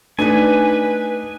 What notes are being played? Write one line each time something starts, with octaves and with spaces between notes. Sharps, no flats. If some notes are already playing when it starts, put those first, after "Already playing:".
A3 D4 D#4 B4 G#5